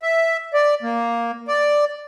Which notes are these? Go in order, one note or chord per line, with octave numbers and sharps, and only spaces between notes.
E5
D5
A#3
D5